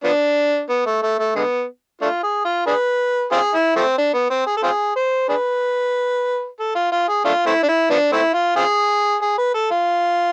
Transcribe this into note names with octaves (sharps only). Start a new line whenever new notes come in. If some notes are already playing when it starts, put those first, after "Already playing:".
F3 B3 D4
B3
A3
A3
A3
D3 G#3 B3
A3 D4 F4
G#4
F4
D4 G#4 B4
C4 F4 G#4
E4
F3 A3 C4
D4
B3
C4
G#4
A4
C4 F4 G#4
C5
D4 G#4 B4
A4
F4
F4
G#4
A3 D4 F4
A3 C4 E4
D4
E4
F3 B3 D4
A3 C4 E4
F4
C4 F4 G#4
G#4
B4
A4
F4